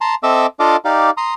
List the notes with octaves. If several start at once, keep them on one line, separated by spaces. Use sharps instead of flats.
A5 A#5 C6
C4 A4 D#5 E5 D6 E6
D4 F4 A4 D#5 F5 D6
D#4 G4 D5 F5
A#5 C6 D#6